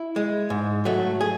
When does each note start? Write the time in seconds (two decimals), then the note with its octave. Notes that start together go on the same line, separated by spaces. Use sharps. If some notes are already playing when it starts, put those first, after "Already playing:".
Already playing: E4
0.16 G#3
0.50 G#2
0.85 F#3 A3
1.21 G#4